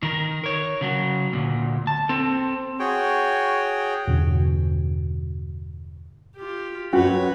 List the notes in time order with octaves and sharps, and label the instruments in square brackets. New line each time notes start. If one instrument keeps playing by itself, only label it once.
[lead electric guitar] D#3 A#4
A#4 C#5
C#3 F#3
D2 A#2
A5
C4 A4
[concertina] F#4 G#4 C#5 G5
[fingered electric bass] E2 G2 B2 D3
[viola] F4 G4
[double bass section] F#2 F#3 [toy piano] C#4 [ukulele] F#4 [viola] B4 C#5